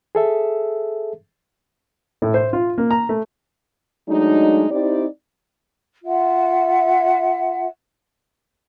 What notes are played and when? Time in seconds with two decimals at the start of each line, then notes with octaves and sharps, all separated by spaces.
0.15 G#4 A4 E5
2.22 A2
2.34 C5
2.53 F4
2.78 A#3
2.91 A#5
3.09 A3
4.09 F#3 G#3 A3 D4 D#4
4.71 C4 D#4 E4 G4 D5
6.04 F4 E5 F#5